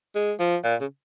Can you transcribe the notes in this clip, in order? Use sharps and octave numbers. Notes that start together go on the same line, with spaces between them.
G#3
F3
A#2
C#3